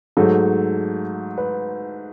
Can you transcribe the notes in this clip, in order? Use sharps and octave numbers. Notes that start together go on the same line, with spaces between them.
G#2 F#3 A3 A4
B4